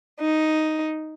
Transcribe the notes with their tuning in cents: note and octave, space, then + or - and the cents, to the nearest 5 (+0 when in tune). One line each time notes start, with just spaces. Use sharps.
D#4 +0